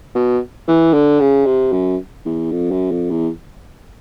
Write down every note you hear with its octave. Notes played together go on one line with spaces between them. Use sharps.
B2
E3
D3
C#3
C3
F#2
E2
F2
F#2
F2
E2